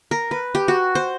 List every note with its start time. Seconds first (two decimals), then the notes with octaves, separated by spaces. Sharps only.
0.11 A#4
0.31 B4
0.55 G4
0.68 F#4
0.95 C5